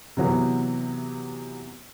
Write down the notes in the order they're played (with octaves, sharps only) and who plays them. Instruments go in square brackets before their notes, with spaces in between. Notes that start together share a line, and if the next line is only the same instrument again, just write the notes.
[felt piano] C3 E3 F#3 B3